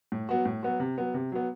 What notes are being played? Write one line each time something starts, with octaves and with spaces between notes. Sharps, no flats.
A2
F#3 B3 F#4
A2
F#3 B3 F#4
C3
F#3 B3
C3
F#3 B3